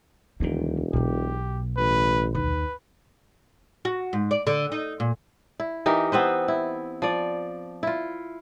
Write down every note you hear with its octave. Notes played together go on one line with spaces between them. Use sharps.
E1 D2 D#3 F3 G3
B1 B2 B3 G4
A1 B4
D#2 B4
F#4
G#2
D5
D3
D#4
A#2
E4
E3 D#4 G4 A#4
B3 C4 B4 C5
E4
F3 D5
E4 F4